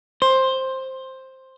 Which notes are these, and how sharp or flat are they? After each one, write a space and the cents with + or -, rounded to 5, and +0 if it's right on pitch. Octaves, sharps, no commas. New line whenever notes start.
C5 +10